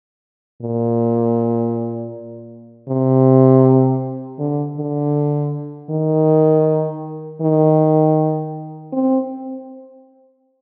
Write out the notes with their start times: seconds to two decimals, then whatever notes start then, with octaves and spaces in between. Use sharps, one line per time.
0.62 A#2
2.89 C3
4.39 D3
4.78 D3
5.90 D#3
7.42 D#3
8.93 C4